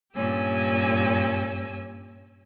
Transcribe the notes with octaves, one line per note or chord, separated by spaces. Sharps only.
G2 A#2 C#4 G4 G#5 E6